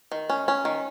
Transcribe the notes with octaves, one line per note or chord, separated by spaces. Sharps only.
D#3
C#4
C#4
D#3